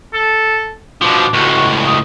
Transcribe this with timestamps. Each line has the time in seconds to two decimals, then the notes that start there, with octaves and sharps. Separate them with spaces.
0.14 A4
1.02 B2 F3 D4
1.33 C#2 A2 F#4
1.86 D#6